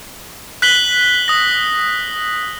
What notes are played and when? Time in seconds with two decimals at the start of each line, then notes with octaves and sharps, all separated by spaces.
0.62 F#6 B6 F#7 G7
1.28 D#6 A#6